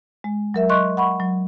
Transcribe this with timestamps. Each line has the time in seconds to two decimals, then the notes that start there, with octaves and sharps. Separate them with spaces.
0.24 G#3
0.54 F#3 A#4 E5
0.69 D#5 C6 C#6 F#6
0.97 F#5 B5 C#6
1.20 F#3